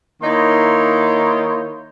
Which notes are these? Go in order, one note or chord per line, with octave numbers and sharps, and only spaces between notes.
D#3 A#3 D#4 E4 C#5 C6